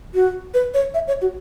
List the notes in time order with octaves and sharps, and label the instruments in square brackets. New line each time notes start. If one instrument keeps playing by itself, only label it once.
[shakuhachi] F#4
B4
C#5
E5
C#5
F#4